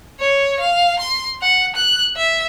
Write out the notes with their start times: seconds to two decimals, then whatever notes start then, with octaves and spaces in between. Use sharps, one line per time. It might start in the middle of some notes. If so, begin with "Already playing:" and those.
0.20 C#5
0.60 F5
0.99 C6
1.42 F#5
1.76 F#6
2.16 E5